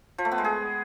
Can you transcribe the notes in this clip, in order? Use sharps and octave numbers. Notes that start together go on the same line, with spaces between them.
F3
A3
B3
G#3
G#4